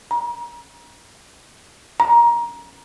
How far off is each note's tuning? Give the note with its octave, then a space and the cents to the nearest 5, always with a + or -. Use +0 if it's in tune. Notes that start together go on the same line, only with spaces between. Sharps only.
A#5 +30
A#5 +20